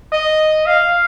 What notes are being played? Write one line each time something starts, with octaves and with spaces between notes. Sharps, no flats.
D#5
F5